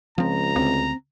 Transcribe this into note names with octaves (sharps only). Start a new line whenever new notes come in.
C#2 F3 C4 A#5
D2 C4